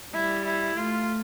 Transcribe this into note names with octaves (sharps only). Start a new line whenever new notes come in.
G3 E4
E4
A3 F4